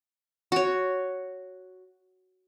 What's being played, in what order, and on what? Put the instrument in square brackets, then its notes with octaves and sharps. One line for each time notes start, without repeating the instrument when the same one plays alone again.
[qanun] F#4 C#5